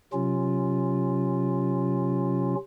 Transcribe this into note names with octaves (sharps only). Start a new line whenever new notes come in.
C3 F#3 C#4 F4